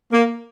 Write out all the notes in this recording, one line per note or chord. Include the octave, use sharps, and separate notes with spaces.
A#3